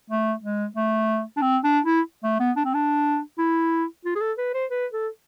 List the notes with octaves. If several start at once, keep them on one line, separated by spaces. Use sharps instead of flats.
A3
G#3
A3
D4
C4
D4
E4
A3
B3
D4
C4
D4
E4
F4
G#4
A4
B4
C5
B4
A4